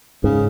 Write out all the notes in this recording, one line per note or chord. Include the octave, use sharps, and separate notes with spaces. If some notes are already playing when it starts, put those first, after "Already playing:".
G#2 C#3